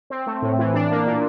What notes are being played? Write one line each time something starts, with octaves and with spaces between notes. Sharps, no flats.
C4
A3
A2
E3
D4
A#3
A#2